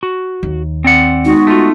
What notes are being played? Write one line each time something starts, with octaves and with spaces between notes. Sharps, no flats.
F#4
D#2
C4 D5 F#5
G#3 B3 D#4 F#4
A3 F4